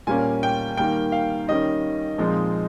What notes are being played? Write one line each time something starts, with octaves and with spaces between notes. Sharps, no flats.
A#2 G3 A#3 C#4 G#5
G5
D#3 G3 A#3 G5
F5
D#3 G3 C#4 D#5
A#2 F3 G#3 C4 D#4